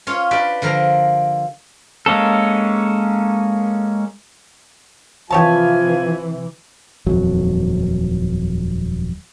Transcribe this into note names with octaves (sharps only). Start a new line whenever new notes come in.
C#4 F4 C#5
D4 G4 B4 D5 E5
D3 F3 A#4 A#5
G#3 A#3 C#4 A4
C3 E3 F3 F4 G4 C#5 G#5 A5
D#1 F2 F#3